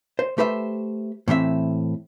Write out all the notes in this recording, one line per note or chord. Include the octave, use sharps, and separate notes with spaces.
C5
A3 G4 B4 C5 E5
A2 E3 C4 E5